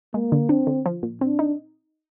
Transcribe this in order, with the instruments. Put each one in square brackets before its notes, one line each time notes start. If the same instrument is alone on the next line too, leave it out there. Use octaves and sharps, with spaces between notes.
[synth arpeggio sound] G#3 [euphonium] A#3
[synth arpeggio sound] D3
[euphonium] C4 [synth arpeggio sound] D4
[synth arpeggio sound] D3
F3
A#2
[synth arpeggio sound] C4 [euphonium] D4
[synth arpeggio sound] D#4